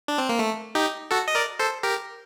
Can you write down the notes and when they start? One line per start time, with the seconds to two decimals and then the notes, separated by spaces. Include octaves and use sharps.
0.08 D4
0.18 C4
0.29 A#3
0.39 A3
0.75 D#4 G4
1.11 F#4 A4
1.28 D#5
1.35 A#4 D5
1.59 A4 C5
1.83 G4 A#4